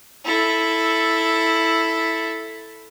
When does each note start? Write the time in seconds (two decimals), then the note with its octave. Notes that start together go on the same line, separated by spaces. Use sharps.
0.25 E4 A4